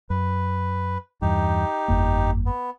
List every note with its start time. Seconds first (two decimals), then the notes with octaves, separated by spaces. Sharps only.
0.10 F#2 B4
1.22 E2 G2 D#4 G4
1.88 G1 F2 A#3
2.46 B3